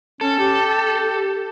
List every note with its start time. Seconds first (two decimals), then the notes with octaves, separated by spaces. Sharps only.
0.21 C#4 A4
0.39 G4